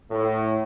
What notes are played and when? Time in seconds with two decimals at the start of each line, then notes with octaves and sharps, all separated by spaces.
0.10 A2